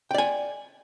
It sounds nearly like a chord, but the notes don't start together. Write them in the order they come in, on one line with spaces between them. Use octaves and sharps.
G5 D5 G#5